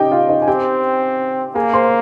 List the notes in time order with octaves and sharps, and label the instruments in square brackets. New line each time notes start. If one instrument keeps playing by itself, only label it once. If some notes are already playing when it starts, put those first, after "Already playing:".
Already playing: [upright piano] C#4 D#4 G4 D#5 G5
F4 F5
D#4 D#5
G#5
[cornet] C4 [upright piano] G4 G5
[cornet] A#3 [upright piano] G#4 G#5
[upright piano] C5 C6